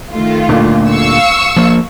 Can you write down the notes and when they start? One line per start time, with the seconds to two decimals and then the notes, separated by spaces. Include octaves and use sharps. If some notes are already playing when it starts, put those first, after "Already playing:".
0.12 D#3 A3 F4
0.49 D2 A#2
0.90 F5 C#6 E6
1.56 F3 A#3